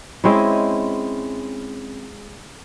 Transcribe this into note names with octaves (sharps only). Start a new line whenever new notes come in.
G#3 C4 C#4 E4